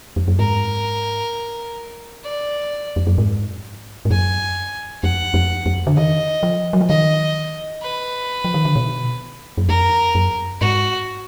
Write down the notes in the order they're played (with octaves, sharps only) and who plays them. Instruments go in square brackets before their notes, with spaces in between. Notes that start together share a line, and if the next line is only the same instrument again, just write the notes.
[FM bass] F2
F#2
[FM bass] G#2 [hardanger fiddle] A#4
[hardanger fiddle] D5
[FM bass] F2
F#2
G#2
G#2
[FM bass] F#2 [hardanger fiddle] G#5
[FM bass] F2 [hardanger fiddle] F#5
[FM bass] F2
F2
D3
[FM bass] D#3 [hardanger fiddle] D#5
[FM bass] F3
F#3
F3
[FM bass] D#3 [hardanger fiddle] D#5
[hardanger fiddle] B4
[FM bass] F3
D#3
D3
B2
F#2
[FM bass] F2 [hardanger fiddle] A#4
[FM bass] F#2
[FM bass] G#2 [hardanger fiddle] F#4